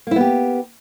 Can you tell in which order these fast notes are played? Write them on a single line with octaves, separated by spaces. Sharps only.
A#3 E4 B3 G4